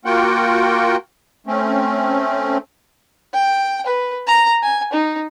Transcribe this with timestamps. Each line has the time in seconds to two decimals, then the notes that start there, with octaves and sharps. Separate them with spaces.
0.05 A#3 F4 F#4 A#4 F#5 G5
1.47 A3 C4 C#4
3.34 G5
3.86 B4
4.27 A#5
4.63 G#5
4.93 D#4